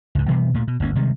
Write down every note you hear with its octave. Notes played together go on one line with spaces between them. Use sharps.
C#2 G#2
B2 E3 G3 B3
D2 A#2 A3
B2
G1 D2 A#3 C#4
C3 D#3 G3 G#3